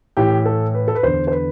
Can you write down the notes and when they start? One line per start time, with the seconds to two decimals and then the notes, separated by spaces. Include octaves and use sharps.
0.17 A2 E3 G4
0.45 A4
0.74 B4
0.88 A4
0.95 B4
1.03 E2 D3 C5
1.27 C5
1.32 B4